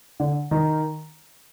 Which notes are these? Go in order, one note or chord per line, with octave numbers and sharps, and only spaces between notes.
D3
D#3